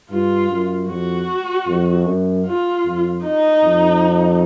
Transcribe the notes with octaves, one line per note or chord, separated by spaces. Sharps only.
G2 F4
F#2
F2 F#4
F2
F#2
F4
F2
D#4
F2